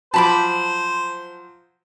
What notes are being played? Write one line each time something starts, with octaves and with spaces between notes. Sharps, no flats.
F3 F#3 C5 A5 B5 D6